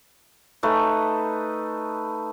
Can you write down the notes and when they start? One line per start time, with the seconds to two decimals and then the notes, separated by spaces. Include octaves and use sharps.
0.63 A3 D#4 B4